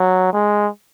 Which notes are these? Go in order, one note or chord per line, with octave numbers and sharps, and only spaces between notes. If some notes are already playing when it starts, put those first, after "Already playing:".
Already playing: F#3
G#3